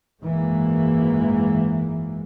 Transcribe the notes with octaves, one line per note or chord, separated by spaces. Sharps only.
G#1 F#2 E3 G#3 A#3